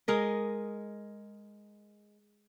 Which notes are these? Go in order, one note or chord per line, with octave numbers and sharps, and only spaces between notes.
G#3 A#4 D#5